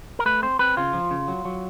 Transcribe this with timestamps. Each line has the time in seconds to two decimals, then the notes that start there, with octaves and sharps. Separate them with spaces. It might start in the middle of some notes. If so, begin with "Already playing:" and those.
0.19 A#4
0.26 A3 B4
0.42 C4 C5
0.59 C4 B4
0.77 C#3 F4
0.93 F3
1.11 C#3
1.28 F#3
1.45 F#3